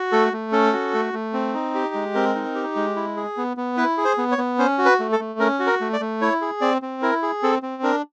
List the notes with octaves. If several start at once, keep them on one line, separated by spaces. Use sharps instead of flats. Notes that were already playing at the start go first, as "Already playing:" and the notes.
Already playing: F#4
A3 A4
A3
C#4 A4
F#4
A3
A3
C4
D#4
G4
G#3
C4 A#4
D#4
G4
G#3
E4
G#4
B3
B3
E4 B4
G#4
C5
B3
C#5
B3
C#4 C5
F#4
B4
A3
A4
A3
C#4 A#4
F#4
A#4
A3
D5
A3
E4 C#5
G#4
C4 D5
C4
E4 A#4
G#4
C4 A4
C4
D4 A#4